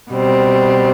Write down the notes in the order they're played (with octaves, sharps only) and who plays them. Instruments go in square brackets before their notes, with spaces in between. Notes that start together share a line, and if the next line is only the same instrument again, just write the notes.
[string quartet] B2 G3 C4